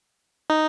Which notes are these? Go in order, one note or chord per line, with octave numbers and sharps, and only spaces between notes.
D#4